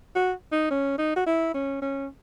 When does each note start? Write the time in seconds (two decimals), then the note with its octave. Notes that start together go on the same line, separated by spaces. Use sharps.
0.15 F#4
0.52 D#4
0.71 C#4
0.98 D#4
1.16 F#4
1.26 E4
1.54 C#4
1.82 C#4